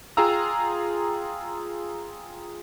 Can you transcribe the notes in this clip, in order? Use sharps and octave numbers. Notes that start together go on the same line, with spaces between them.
F4 G#4 F5 G5 A#5 E6